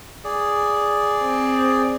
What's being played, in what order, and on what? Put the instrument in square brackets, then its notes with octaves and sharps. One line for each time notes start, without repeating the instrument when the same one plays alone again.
[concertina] G#4 D5
[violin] C4